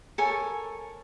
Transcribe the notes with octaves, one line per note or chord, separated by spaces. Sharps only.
A4 A#4 C#5 G#5